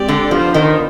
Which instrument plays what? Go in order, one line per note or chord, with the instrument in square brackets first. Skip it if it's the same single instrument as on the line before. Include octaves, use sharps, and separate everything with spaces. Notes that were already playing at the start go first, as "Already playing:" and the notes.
Already playing: [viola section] G#3 C4 G4 D5
[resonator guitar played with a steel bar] D3
[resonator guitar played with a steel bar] F3 [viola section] B3 D4 F4 C5
[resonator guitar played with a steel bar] D#3